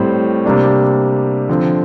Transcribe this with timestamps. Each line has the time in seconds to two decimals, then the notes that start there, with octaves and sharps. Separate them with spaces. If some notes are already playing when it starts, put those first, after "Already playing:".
Already playing: A2 G3 C4
0.45 C3 G3 A#3 D4
1.49 D3 F3 C4